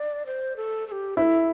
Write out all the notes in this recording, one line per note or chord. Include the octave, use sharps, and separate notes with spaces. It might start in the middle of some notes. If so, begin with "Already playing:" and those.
Already playing: D5
C5
A4
A4
G4
E4 A4 C5